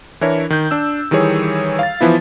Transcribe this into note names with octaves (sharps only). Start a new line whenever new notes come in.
E3 D4 E4 A#4 C#5
D#3 G6
D4 E6
D#3 E3 G3 G#4 C#5
F5 A6
E3 F3 B3 E4